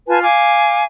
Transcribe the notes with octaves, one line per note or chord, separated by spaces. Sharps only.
F4 B4 G#5 A5
F5 G#5 D6